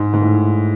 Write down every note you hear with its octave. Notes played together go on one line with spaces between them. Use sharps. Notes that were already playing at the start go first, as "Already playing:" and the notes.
Already playing: G#2
G#2
A2